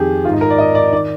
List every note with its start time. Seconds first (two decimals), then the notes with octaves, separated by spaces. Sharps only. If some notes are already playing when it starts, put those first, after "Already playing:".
Already playing: F2 D#3 G4 G#4
0.25 D#3 F4
0.29 G#2 D#4
0.41 A#4
0.50 D5
0.58 D#5
0.75 D5
0.92 D#3 D5